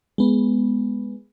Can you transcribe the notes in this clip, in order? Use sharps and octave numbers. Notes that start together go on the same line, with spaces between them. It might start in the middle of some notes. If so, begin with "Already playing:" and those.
G#3 B3